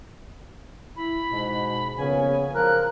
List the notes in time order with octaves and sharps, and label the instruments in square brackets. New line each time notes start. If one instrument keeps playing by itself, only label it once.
[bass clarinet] E4 [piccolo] B5
[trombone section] G#2 [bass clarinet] B2
[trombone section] A#1 B3 C#4 [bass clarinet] C#3 [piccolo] G#5
[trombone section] F3 [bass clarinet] A#4 [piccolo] F#6